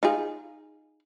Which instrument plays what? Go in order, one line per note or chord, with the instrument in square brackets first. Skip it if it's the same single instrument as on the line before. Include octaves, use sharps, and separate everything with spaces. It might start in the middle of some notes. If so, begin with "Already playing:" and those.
[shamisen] D#4 F4 G#4